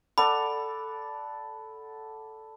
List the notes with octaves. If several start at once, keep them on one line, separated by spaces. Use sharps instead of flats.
A4 D5 F#5 B5